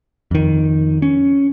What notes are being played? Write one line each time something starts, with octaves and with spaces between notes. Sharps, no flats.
F2 D#3
C#4